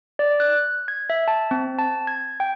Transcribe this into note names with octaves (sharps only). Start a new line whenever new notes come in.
D5
F#6
G#6
E5
A5
C4
A5
G#6
G5